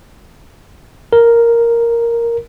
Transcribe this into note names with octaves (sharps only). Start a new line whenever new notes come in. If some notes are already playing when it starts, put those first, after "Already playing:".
A#4